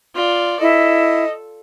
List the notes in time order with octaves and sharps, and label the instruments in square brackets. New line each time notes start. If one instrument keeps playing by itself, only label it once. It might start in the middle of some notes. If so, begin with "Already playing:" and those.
[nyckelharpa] F4 D5
[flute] E4 [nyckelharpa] A4 [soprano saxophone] D#5